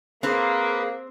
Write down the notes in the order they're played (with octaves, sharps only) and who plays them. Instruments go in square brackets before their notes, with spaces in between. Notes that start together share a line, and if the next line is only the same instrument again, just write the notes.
[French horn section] A#3 [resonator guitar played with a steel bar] C4 C5 [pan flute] G#4 [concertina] B4